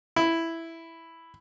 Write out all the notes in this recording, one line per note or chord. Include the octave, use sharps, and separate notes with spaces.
E4